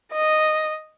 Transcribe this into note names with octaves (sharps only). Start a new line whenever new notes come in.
D#5